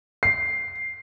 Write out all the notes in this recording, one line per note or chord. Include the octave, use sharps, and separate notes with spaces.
C7